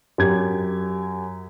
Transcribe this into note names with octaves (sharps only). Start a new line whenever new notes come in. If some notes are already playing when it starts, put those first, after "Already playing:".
F#2 G4 G#6